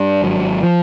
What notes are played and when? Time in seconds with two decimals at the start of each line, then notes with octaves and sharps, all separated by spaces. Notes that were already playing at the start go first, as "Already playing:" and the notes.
Already playing: G2
0.22 G#1 F#3
0.63 F3